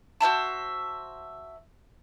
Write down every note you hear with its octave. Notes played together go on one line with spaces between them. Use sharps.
F#4 C5 E5 A5